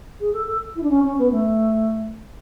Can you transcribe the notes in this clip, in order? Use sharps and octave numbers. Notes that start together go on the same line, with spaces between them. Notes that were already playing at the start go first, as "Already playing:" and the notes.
G#4
A4
A4
E4
D4
C#4
C#4
B3
A3